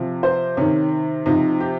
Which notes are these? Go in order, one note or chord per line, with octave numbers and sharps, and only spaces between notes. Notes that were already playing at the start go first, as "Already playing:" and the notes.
Already playing: C3 F3
C5
C3 D#3 C#4
C3 F3 D#4
G4